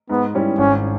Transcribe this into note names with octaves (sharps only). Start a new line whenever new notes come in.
G#2 B3
G3 C#4 E4
G#1 C#4